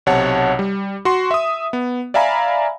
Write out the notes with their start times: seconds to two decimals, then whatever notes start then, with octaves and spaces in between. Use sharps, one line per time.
0.06 B1 C3 C#5 F#5 A5
0.59 G3
1.05 F#4 C6
1.31 E5 D#6
1.73 B3
2.14 D5 E5 F5 G#5 A#5 B5